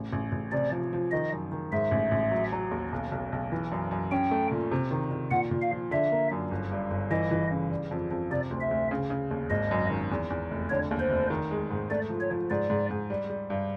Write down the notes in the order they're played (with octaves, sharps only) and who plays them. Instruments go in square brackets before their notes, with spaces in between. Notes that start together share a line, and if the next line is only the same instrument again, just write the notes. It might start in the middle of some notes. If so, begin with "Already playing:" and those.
Already playing: [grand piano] A1
A1
A1
[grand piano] C3 [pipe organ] D5
[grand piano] F3
F3
[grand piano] D#3 [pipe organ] D#5
[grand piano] F#2
D#3
[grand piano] G#2 [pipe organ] E5
[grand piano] A1
A1
F#3
F#3
D#2
B1
B1
B1
E3
F#2
F#2
[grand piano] C#4 [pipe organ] G5
[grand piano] A3
A#2
C3
D#3
D#3
[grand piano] A#2 [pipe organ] F#5
[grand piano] A#2
[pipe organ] F5
[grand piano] F3
[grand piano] D3 [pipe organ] E5
[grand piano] A#3
F#2
G1
G2
G1
[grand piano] E3 [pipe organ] D#5
[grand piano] E3
C#3
G3
F2
F2
[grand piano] C3 [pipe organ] D5
[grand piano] D2
[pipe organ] E5
[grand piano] D2
C#3
C#3
D#2
[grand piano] G#1 [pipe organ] D#5
[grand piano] F#2
D#3
E2
E2
F1
[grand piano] D3 [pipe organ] C#5
[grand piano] D#2
[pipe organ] C5
[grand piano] F1
D#3
G#3
G#2
[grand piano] A3 [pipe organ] D5
[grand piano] F3
[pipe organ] C#5
[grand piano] F3
[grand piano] G#2 [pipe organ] D5
[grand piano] G#2
G#2
G3
G3
G2